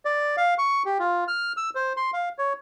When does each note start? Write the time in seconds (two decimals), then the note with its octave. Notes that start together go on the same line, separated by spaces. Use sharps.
0.05 D5
0.37 F5
0.58 C#6
0.86 G4
0.99 F4
1.28 F6
1.57 E6
1.75 C5
1.97 C6
2.13 F5
2.39 C#5